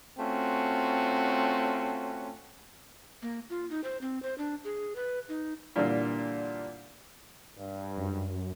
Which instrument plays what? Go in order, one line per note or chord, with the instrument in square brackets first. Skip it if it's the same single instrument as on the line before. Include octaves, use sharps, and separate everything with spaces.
[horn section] A3 C4 C#4 F4 F#4
[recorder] A#3
F4
D#4
C5
C4
C5
D4
G#4
B4
D#4
[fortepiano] A#2 D3 E3 G3 A#3
[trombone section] G2
[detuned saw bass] F#2